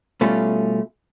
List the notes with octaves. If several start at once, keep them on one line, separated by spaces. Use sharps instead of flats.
B2 G3 A3 C#4 F4